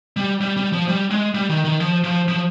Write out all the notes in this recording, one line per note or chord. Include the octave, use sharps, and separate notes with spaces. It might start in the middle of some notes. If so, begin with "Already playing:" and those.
G3
G3
G3
F3
G3
G#3
G3
D#3
D#3
F3
F3
F3